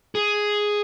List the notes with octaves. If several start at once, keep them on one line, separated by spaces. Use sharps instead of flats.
G#4